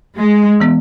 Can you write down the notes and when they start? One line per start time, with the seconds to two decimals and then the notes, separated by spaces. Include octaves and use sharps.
0.18 G#3
0.60 E3 B3